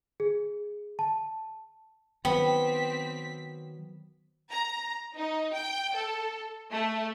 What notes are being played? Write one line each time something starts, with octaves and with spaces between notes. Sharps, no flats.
G#4
A5
D#3 F#3 B3 C4 G5 B6
A#5
D#4
G5
A4
A3